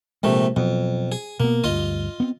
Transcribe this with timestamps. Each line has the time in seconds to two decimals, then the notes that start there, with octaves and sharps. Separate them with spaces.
0.23 A#1 C3 G#3 A3
0.56 F2 B2 F#3 B3
1.12 G#4
1.40 B2 A#3 B3
1.64 D2 G2 F4 D#5
2.20 B3 C4